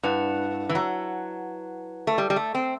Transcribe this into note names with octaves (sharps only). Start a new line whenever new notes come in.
G2 E4 B4 F#5 A5
E3
F#3
A3
G3
G3
A3
C4